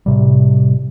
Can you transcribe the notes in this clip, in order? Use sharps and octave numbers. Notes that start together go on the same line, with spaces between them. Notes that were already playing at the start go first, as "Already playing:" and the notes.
A2 C3 G3